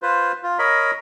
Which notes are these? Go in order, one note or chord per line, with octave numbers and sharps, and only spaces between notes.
F4 B4 C5
F4
A#4 C#5 D#5 B5